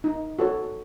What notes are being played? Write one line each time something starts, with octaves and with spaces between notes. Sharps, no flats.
D#4
F#4 A4 C#5